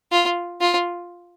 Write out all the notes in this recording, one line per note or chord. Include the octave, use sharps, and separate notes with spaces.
F4
F4